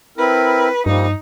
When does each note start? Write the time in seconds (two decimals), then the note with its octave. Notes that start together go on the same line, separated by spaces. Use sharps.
0.18 C4 E4 A#4 B4
0.86 G2 F3 G3 A#3 D#4